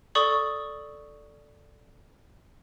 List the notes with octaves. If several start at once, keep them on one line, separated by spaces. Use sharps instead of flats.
A4 D5 C#6 D#6 F#7